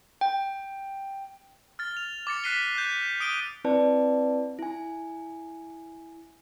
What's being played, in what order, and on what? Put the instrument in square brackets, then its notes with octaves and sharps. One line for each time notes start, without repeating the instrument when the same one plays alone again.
[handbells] G5
[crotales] F6 A6
F7
D6 A6 C#7
F#6 A6 B6 C7 D#7 G7
F#6 G6
D#6 D7 D#7 G7
[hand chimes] C4 E4 B4 D5 A5
E4 G#5